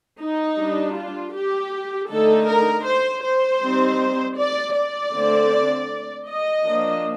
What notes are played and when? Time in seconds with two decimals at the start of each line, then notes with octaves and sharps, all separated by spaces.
0.20 D#4
0.57 G3 D4
0.95 F4
1.33 G4
2.09 D3 A3 D#4 A4
2.47 A#4
2.86 C5
3.23 C5
3.62 G3 C4 D#4
4.37 D5
4.75 D5
5.13 D3 A3 C4
6.27 D#5
6.65 F3 A#3 D4